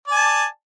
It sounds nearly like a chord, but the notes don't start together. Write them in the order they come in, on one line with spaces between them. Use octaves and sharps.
D5 G#5 A5